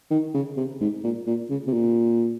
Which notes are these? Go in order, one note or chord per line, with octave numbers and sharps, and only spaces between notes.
D#3
C#3
C3
G#2
A#2
A#2
C#3
C3
A#2